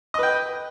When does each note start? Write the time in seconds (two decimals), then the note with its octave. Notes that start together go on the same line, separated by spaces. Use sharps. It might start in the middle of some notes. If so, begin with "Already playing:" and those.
0.14 D#5
0.19 B4
0.23 G5